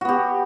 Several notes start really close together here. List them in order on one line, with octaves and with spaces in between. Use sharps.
F#4 B3 G4